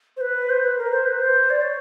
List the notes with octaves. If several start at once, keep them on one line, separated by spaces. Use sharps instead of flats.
C5
B4
C5
B4
A#4
C5
B4
C5
D5
C#5